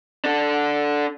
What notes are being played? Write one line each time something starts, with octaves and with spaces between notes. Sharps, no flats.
D4 A4